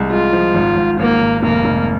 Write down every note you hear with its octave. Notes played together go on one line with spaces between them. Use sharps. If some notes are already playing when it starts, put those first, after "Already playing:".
Already playing: C2 G#3
G#3 F4
F3
G#1
G#1
G#1 A#3
G#1
F1 A#3
F1